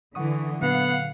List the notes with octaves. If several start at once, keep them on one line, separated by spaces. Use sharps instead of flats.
D3 E3 F#5 C#6 D#6
A#2 D3 F#3 B3 F5 F#5